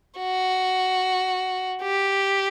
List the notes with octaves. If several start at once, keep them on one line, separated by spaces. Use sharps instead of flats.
F#4
G4